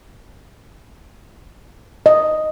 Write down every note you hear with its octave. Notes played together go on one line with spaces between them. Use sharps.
D#5